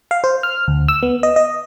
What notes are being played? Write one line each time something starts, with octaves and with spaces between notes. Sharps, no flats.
F5
C5
F6
D2
E6
B3
D#5
D#5